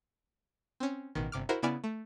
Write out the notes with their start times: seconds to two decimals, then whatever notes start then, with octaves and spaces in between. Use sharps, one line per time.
0.80 C4 C#4
1.15 A1 B2 D#3
1.32 G1 C3 D6 F6
1.49 E4 F#4 A#4 C5
1.62 C#3 B3 E4 D5 G#5 F6
1.84 A3